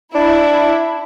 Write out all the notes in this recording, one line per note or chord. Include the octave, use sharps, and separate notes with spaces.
D4 E4